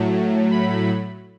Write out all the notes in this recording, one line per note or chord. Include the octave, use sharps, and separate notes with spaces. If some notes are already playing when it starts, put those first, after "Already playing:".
Already playing: A2 F#3 A3
B5